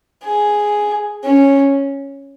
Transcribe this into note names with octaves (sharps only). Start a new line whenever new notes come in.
G#4
C#4